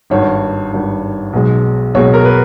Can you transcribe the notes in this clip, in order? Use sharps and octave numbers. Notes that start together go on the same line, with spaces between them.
G#1 G2 D#3 C#5
G#1 G2 D#3
B1 B2 G#3
B1 B2 G#3 C#5
A#4
B4